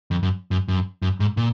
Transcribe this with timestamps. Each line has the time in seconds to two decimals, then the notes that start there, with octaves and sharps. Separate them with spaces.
0.11 F2
0.23 F#2
0.51 F#2
0.68 F#2
1.02 F#2
1.20 G#2
1.37 A#2